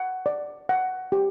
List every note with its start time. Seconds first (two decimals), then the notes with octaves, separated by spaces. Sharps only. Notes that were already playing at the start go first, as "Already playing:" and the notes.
Already playing: F#5
0.26 D5
0.69 F#5
1.12 G4